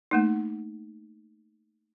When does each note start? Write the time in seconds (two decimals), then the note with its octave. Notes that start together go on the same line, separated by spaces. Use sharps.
0.11 A3 A#3 D#4